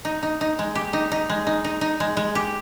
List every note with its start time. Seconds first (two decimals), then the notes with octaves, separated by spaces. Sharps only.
0.05 D#4
0.23 D#4
0.41 D#4
0.59 G#3
0.75 G4
0.93 D#4
1.12 D#4
1.29 G#3
1.47 D#4
1.64 D#4
1.81 D#4
2.00 G#3
2.17 G#3
2.35 G4